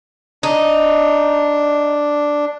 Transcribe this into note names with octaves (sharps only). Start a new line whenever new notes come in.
D4 D#4